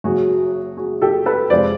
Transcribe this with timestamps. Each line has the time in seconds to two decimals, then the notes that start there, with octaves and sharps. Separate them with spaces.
0.04 F#1 F#2 C#3 F#3 F#4 G#4
0.77 F#4 G#4
1.02 G4 A4
1.26 A4 B4
1.50 F2 C3 F3 G#3 C5 D5